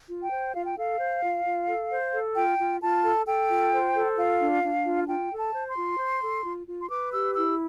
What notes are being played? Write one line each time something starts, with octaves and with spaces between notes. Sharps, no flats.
F4
G5
C5
F4 F5
G5
A4 F5
C5
F4
F4
A4
C5
A4
F4 G5
F4
F4 A5
A4
A4 G5
F4
C5
A4
F4 F5
D4
D4
F4
F4 G5
A4
A5
C5
C6
F4
C5
A4
F4
F4
C6
B4 D6
G4 E6
E4 E6